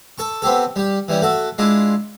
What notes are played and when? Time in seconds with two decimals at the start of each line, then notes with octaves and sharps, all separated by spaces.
0.18 A4 A5 C#6
0.42 B3 C4 G4 A4
0.76 G3 G4
1.08 E3 G3 C#4
1.21 A3 F#4 A4
1.58 G#3 D4 E4 F4